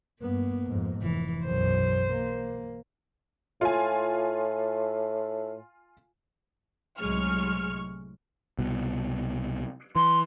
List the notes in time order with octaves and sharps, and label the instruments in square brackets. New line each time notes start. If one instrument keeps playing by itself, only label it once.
[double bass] G2 B3 [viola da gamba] A#3
[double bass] F2 G#2
[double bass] F1 [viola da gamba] E3
[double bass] B1 F#2 [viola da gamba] C5
[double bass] A#3
[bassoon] A2 [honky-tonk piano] F4 G#5
[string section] C2 A2 F#3 G#3 C#6 F6
[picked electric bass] C2 B2
[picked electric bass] E3 [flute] C6